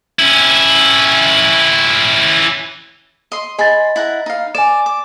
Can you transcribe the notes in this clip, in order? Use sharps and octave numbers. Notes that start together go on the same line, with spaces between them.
C#4 E4
D#5 C6
G#4 D#5 B5 C6 A6
E4 F#5 A#5
D#4 F5
D5 G#5 E7
D6